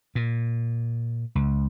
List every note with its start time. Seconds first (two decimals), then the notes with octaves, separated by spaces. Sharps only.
0.15 A#2
1.35 C#2